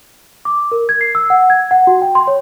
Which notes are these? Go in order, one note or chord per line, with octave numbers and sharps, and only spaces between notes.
D6
A#4
G#6
C7
E6
F#5
G#6
F#5
F#4
G5
C6
C#5